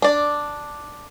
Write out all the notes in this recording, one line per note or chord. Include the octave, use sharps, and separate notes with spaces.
D4 D5